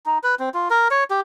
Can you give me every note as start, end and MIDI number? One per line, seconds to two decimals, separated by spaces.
0.06 0.18 63
0.23 0.35 71
0.39 0.49 60
0.54 0.68 65
0.70 0.88 70
0.91 1.04 73
1.10 1.21 67